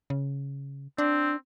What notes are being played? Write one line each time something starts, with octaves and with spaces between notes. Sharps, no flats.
C#3
C4 D4